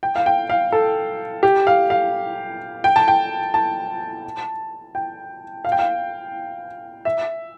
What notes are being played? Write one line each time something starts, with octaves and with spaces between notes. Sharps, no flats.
G5
F5
G5
F5
A4
G4
F5
F5
G5
A5
G5
A5
G5
F5
G5
F5
E5